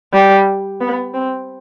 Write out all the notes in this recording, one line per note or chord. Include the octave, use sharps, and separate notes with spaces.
G3
B3
C4